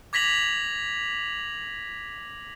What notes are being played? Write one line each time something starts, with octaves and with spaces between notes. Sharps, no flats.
D6 G#6 A#6 B6 F7 F#7